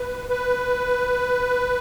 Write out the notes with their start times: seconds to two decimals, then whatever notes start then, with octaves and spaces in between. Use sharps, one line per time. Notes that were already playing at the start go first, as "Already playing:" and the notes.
Already playing: B4
0.29 B4